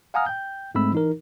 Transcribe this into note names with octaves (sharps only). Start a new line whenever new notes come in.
F5 F#5 G#5 A#5 D#6 F6
G5 G6
G#2 G#3 A3 C4 B5 E6
E3 D#4 A#4